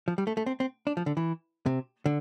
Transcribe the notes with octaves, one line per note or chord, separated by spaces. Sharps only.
F3
G3
A3
A3
C4
C4
D4
F3
D3
E3
C3
D3